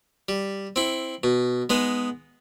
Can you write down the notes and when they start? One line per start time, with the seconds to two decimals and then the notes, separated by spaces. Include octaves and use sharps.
0.29 G3
0.76 C4 E4
1.23 B2
1.70 G#3 B3 D#4